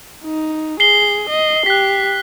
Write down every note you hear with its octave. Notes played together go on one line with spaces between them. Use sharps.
D#4
G#4 C7 G7
D#5
G4 F#6 B6